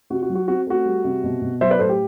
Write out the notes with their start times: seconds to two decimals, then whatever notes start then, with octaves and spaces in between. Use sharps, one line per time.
0.10 C3 F#4
0.22 F#4
0.30 F#3
0.35 F#4
0.48 C4 F#4
0.67 A3 F#4
0.85 G3
1.04 C3
1.24 B2
1.42 B2
1.61 F#3 C5 E5
1.70 B4 D5
1.79 A2 A4 C5
1.89 G4